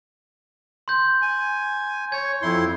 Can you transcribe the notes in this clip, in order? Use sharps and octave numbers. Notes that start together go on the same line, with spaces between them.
C6 G6
G#5
C#5 G#6
F2 E4 C6